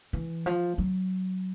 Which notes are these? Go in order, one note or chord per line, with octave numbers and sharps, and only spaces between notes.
E3
F3
F#3